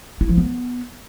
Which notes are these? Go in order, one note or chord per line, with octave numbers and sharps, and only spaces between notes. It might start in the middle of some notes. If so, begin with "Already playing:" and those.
E4
F3
B3